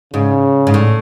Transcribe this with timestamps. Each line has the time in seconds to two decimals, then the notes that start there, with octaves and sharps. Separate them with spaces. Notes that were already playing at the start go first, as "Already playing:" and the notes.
0.14 G#2 C#3
0.67 G#2
0.74 A2